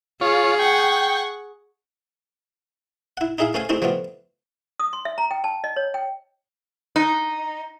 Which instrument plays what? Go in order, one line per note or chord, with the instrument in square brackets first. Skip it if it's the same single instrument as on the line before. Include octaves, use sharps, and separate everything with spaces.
[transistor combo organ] F4 C#5 [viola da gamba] G#4
[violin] F#5 C#6 [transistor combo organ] G5
[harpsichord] E4 F#5
D#4 E4 G#4 E5 F5
A3 C#4 A4 C5 F5 G#5
G#3 A3 C4 D4 E4 G4
F3 G3 A3 B3 F4
[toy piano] D#6
C6
E5
A#5
G5
A5
D#5
C#5
G5
[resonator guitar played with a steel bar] D#4